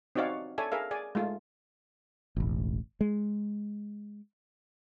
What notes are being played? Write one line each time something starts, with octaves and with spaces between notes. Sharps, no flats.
C4 D#4 F#4 C#5 D5 F5
A4 C#5 D5 E5 G#5
G#4 A#4 E5 F5
G#4 D5 G#5
G#3 A3 F4
E1 A1
G#3